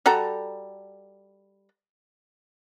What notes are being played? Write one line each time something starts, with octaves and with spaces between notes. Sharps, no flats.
G3 F#4 A4 A#5